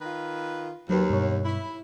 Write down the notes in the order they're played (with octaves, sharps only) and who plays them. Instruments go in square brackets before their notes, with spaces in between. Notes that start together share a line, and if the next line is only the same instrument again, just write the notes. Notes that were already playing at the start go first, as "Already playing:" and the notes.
[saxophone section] D#3 F4 B4
[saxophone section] D#2 [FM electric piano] F#3 B4
[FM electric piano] G2 B2 C#5
[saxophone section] E4